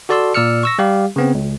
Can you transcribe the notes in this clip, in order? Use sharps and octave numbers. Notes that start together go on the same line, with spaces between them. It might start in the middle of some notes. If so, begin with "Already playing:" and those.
F#4 A4 D5 A5 C6 E6
A#2 D5 E6 F6 C#7
C#6 E6 A#6
G3 G4 F5
C#3 B3 C4
C#2